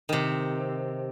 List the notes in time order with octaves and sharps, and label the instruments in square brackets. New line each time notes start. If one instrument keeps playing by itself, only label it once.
[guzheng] C3 D#3